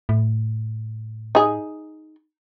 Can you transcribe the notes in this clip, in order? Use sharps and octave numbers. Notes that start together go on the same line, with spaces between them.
A2
D#4 G#4